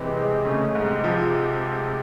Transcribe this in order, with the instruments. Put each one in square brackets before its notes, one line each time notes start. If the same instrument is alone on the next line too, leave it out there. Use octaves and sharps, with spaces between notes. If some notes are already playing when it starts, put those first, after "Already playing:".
Already playing: [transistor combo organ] C3 [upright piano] E3 G#3
[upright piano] G#3
[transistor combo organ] C#3 [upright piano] A3
[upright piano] G#2
[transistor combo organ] C3
[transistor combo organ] C3 [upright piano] F3